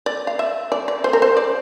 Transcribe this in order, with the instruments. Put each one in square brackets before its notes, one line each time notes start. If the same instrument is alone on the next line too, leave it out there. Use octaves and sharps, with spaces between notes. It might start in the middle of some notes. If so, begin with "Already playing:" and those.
[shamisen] D5
F5
E5
D5
D5
C5
A#4
C5
D5